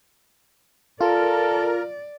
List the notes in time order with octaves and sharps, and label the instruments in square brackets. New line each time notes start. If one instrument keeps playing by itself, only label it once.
[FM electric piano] F4 [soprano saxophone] A4 [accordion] A#4 [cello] D5